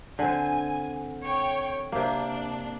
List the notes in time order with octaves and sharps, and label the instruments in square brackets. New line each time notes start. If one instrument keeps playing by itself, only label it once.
[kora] D3 C4 [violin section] G#5
[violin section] C#5 G5
[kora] C3 A#3 [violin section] D4